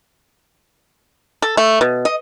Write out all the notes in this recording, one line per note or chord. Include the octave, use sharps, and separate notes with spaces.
A4
A3
B2
D#5